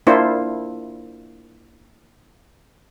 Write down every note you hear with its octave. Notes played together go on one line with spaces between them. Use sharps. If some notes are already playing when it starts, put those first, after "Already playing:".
A#3 D4 E4 F4 C5